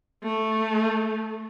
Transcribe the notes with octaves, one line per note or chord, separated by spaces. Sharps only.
A3